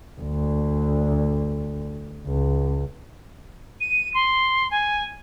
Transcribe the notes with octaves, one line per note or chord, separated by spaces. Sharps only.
D2
C#2
D#7
C6
G#5